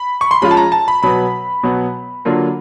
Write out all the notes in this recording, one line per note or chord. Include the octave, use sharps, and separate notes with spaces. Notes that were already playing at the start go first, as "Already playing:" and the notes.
Already playing: B5
C#6
C6
F3 G#3 C#4 F4 B5
A5
A#5
A5
B5
B2 F#3 B3 B5
B2 F#3 B3
D3 F#3 A#3 D4 F4